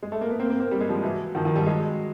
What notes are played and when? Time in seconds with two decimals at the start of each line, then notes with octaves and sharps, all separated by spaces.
0.03 G#3
0.12 A3
0.21 A#3
0.30 B3
0.39 A#3 C4
0.50 A#3 C4
0.60 A#3 C4
0.71 G3
0.80 G#3
0.89 F3 G3
1.03 E3 F#3
1.35 D#3 F3
1.45 D#3 F3
1.56 F3 G3
1.66 F#3 G#3